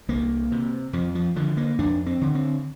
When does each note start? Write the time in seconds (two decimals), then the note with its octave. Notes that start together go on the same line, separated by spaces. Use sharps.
0.09 C2 A#3
0.52 C3
0.93 F2 F3
1.15 F3
1.36 D3 F3
1.57 A#3
1.79 F2 D4
2.06 C4
2.21 D3
2.35 C4